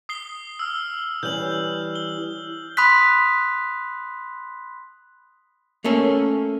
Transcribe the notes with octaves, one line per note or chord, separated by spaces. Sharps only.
D#6 C7 G7
E6 F6
E3 G3 C#4 G6 F#7
G7
B5 C6 D#6 F#6 B6
A3 A#3 C#4 A4